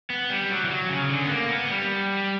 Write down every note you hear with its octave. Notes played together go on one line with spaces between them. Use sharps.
B3
G3
F#3
E3
F#3
C#3
D3
B3
A#3
B3
A#3
G3